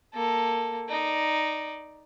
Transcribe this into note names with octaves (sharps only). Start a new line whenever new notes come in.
A#3 A4
D#4 D5